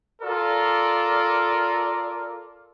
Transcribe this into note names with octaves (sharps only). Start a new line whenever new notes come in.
F4 A4 A#4 D5